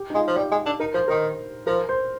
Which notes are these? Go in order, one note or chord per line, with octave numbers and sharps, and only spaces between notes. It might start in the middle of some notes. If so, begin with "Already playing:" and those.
Already playing: G4
D#4
G#3 F4
F3
G3 G4
G#3
D4
D#4 A#4
F3 C5
D#3 A#4
F3 A#4
C5